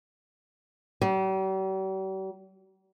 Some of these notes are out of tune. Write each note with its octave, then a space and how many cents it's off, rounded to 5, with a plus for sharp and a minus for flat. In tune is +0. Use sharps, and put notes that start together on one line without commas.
G3 -45